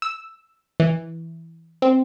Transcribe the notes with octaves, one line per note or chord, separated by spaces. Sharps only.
E6
E3
C4